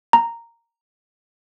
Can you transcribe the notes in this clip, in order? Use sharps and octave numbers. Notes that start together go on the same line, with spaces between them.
A#5